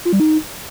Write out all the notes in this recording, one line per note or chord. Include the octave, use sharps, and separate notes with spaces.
F4
G3
D#4